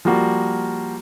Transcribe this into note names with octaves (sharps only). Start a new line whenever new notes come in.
F3 G3 A#3 F#4